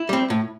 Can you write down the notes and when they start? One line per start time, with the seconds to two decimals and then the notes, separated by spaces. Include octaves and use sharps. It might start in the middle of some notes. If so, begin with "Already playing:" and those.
Already playing: E4
0.09 G3 C4
0.30 A2